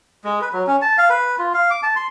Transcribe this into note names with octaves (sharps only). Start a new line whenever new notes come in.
G#3
B4
F#3
C#4
A5
F5
B4
F4
F5
D6
A5
C6